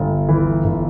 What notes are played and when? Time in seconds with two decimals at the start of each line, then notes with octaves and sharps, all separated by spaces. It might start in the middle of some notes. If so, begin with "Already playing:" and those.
Already playing: G1
0.29 E3
0.64 G1